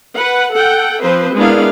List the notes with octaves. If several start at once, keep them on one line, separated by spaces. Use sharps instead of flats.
B4 F#5
A4 F#5 G5
F3 C4 B4 C5
G#3 B3 D4 E4 A#4 F5